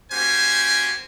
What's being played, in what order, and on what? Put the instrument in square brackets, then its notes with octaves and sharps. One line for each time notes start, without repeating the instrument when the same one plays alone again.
[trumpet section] A#3 C#4 F#4 G4 C5 G#5